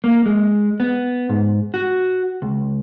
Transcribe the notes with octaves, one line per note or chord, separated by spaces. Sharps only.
A#3
G#3
B3
G#2
F#4
C#2